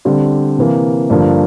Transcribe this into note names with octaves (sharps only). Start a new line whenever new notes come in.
D3 G3 C4
C3 E3 A#3
G2 D3 F3 A#3